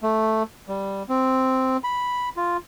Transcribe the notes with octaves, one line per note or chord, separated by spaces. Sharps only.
A3
G3
C4
B5
F4